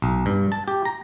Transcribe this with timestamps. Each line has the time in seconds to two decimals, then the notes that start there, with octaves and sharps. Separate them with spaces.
0.02 B1
0.26 G2
0.52 A5
0.68 G4
0.85 A#5